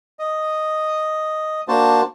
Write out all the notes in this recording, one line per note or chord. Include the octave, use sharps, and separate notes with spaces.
D#5
A#3 D4 F#4 C5 A5